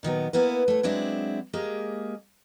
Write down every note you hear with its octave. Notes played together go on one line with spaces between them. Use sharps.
A#2 D#3 F#3 B3
A#3 B3 E4 B4
A3 C#5
F#3 G#3 C4 D4 E4
G#3 A#3 G4 G#4